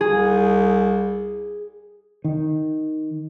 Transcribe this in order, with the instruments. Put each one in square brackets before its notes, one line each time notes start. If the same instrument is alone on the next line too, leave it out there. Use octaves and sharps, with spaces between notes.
[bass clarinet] C2 [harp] G#4
[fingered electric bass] D#3